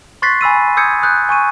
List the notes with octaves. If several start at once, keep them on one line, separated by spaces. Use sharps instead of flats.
C6 C#6 F#6 A6 B6 C7
G#5 B5 E6 D#7
D#6 E6 G6 G#6 C#7
D#6 F#6 G6
G#5 C#6 D#7